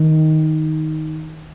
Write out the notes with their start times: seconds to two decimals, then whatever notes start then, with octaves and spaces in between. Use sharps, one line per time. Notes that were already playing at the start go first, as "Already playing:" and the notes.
Already playing: D#3